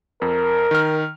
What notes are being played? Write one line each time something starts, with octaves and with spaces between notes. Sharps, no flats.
F2 A#4
D#3 F6